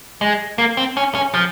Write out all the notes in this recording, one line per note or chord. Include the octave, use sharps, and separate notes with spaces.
G#3
A#3
C4
C#4
C#4
F3